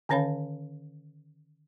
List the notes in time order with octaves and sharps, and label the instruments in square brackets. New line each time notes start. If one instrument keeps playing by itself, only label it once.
[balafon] D3 D#3 C#4 C#5 F5 B5